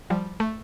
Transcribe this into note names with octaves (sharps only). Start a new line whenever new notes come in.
F3 G3
A3